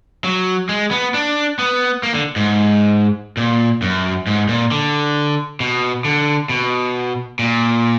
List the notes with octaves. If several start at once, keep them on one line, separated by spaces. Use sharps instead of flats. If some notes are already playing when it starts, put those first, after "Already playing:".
F#3
G#3
B3
D4
B3
A#3
D3
G#2
A#2
F#2
G#2
A#2
D3
B2
D3
B2
A#2